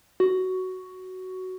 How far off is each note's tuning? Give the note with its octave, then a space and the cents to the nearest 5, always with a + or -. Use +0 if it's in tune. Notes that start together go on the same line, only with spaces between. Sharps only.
F#4 +10